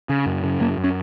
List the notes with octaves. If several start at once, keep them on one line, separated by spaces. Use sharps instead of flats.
C#3
F#2
C#3
F#2 A#3
F#2
C#4